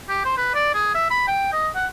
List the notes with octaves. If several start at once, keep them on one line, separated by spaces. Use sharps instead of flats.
G4
C5
B4
D5
G#4
E5
B5
G5
D#5
F#5